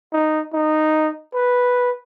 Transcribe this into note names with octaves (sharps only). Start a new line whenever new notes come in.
D#4
D#4
B4